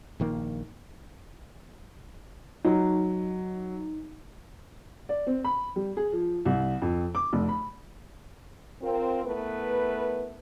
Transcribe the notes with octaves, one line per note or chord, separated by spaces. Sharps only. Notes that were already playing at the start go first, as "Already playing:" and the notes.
A#1 D#3 A#3
F#3 D#4
D5
C4
B5
G3
G#4
F3
C2
F2
D6
F1
B5
C4 F4 A#4
A3 B3 E4 A#4 B4